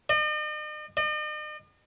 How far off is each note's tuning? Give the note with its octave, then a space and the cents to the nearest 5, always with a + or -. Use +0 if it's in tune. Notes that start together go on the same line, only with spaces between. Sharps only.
D#5 -45
D#5 -45